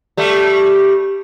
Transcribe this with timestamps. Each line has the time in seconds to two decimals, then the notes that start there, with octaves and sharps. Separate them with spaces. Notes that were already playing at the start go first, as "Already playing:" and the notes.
0.17 G3 A3